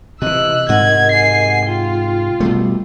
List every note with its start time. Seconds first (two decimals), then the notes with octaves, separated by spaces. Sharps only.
0.22 C3 E3 D#5 E6 F#6
0.69 G#2 C3 A#4 D#5 F#5 G#6
1.12 G#5 C7
1.66 F4 G5
2.40 B2 G3 A3